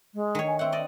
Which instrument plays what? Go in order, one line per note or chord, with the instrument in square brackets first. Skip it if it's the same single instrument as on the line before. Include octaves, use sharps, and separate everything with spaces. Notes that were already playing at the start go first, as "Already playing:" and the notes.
[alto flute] G#3
[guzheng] D#3 C#5
[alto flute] G#5
[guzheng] C4 F#5 [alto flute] E5
[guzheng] D5 D#5